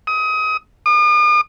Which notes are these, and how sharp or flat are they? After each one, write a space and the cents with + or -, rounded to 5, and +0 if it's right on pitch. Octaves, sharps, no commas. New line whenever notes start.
D#6 +30
D#6 -45